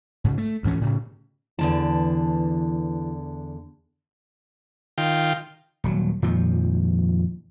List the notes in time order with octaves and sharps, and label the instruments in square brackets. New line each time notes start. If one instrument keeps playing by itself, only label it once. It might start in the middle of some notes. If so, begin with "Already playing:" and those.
[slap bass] G#2 C#3
A3
D2 G#2 E3 C#4
A2 C#3
[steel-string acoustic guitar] E2 D3 A5 [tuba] E3
[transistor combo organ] D#3 F4 G5
[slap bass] D#1 F#3
F2 A#2 D#3 F3